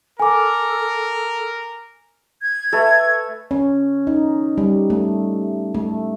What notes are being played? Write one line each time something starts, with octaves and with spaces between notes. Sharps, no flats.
A4 A#4 G#5 D6
G#6
A3 A4 B4
C#4
D#4
G3
A3
A3